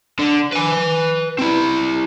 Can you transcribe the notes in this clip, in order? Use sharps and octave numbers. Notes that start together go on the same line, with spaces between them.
D3
B4 G#5
C4 E4